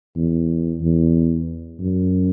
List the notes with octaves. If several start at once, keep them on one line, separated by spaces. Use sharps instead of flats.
E2
E2
F#2